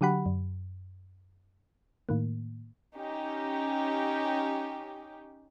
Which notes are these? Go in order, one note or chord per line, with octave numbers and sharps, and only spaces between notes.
D3 F#3 G4 F#5 B5
F#2
A2 D#3 A#3
C#4 D#4 G4